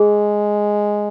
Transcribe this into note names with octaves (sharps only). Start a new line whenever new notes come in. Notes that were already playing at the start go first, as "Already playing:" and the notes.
Already playing: G#3 G#4